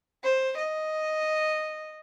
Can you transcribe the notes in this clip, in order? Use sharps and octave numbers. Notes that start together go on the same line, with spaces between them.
C5
D#5